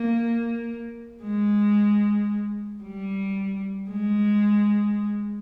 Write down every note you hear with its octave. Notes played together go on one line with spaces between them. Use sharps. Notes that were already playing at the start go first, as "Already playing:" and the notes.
Already playing: A#3
G#3
G3
G#3